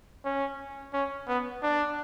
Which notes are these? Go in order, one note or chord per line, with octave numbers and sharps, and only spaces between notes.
C#4
C#4
B3
D4